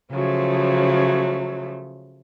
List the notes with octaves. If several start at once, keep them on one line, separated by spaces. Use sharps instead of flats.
C#3 F3 F#3 A3